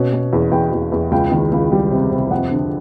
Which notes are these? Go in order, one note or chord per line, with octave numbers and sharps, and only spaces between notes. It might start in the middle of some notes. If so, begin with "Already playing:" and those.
Already playing: B2 C#4
B2
E2
E2 G5
E2
E2
C#2 G5
D#3
C#2
G3
C3
C3
F2 F#5
D3